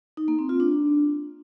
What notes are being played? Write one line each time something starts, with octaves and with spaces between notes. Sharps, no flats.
D#4
A#3
C4
F4
D4